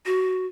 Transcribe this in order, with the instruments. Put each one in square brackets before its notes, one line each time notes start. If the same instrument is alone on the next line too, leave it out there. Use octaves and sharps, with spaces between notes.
[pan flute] F#4